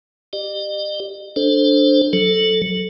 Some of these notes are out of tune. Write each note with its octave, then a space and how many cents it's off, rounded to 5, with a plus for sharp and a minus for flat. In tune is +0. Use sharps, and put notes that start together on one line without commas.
G4 +0 D#5 -45
D4 +0 A4 +0 C5 +10
F#3 +0 A4 +0